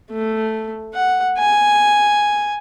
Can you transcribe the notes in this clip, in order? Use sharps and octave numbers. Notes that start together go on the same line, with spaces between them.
A3
F#5
G#5